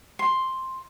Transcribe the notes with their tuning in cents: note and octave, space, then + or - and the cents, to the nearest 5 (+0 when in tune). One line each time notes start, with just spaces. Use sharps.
C6 +5